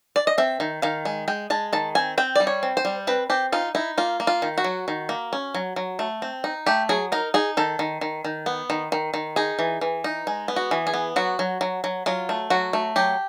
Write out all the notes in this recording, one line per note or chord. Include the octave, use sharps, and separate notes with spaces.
D5
D#5
C4 E5
D#3
D#3 F5
G#3
G#3 G5
G#3 A5
D#3 A5
C4 G#5
C4 G5
G3 D5
C#5
C4
C5
G3
C4 B4
C4 G4
D#4 F4
D#4 E4
A#3 F4
A#3
F4
D#3
F#4
F#3
D#3
A#3
C#4
F#3
F#3
A3
C4
D#4
A3 G4
F#3 G#4
D#4 A#4
D#4 G#4
D#3 A4
D#3
D#3
D#3
B3
D#3
D#3
D#3
D#4 G#4
E3
E3
D#4
G#3
B3
F#4
E3
G#4
B3
F#3 F#4
F#3
F#3
F#3
F#3 F4
A3
F#3 F#4
A3
F#3 G4